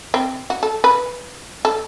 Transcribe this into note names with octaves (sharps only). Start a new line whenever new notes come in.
C4
F#4
A4
B4
A4